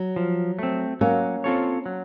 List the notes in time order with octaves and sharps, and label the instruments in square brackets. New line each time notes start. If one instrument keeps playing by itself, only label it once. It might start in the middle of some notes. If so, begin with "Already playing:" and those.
Already playing: [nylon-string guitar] F#3
[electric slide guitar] F3
A3 C4
[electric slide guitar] F#3 [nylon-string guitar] A#3 C#4
[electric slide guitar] C4 F4 A4 C#5
F#3